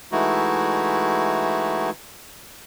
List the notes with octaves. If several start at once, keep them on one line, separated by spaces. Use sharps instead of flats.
E3 G#3 A3 D#4 E4 F#4